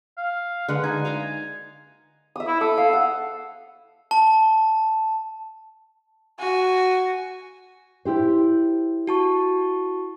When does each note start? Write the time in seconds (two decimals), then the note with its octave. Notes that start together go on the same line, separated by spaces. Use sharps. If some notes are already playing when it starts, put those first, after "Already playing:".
0.18 F5
0.68 D3 G#3 B4 F#5
0.84 D#4 G#5
1.05 F5 G5 A#5
2.36 E5 D#6
2.47 E4
2.61 A4 D#6
2.77 F5
2.93 F#5
4.11 A5
6.39 F#4 G#5
8.05 E4 G4 C5
9.07 F#4 A5 C#6